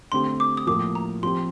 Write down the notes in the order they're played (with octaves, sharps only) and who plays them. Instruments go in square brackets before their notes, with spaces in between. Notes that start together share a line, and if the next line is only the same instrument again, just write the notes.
[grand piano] D3 A3 C4 G4 [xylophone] C6
[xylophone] D6
D#6
[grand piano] A2 F3 A#3 [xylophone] D6
[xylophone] A#5
[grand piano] F3 C4 G4 [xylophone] C6